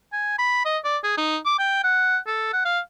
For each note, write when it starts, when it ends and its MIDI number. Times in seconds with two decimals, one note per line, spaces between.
0.12 0.34 80
0.38 0.65 83
0.65 0.78 75
0.84 0.98 74
1.03 1.15 68
1.17 1.37 63
1.45 1.54 86
1.59 1.79 79
1.84 2.17 78
2.27 2.52 69
2.53 2.61 78
2.65 2.80 77